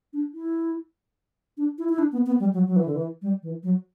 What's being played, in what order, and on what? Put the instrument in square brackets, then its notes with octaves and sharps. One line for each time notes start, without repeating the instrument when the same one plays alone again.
[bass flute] D4
E4
D4
E4
E4
D4
B3
B3
G3
F#3
F#3
E3
D3
E3
G3
E3
F#3